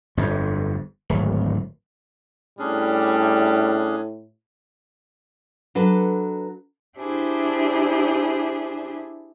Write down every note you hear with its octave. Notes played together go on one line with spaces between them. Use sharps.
G1 F2
D1 G#1
A2 G3 C#4 D4 G#4
F#3 D4 A4 B4
D4 E4 G4 G#4 C5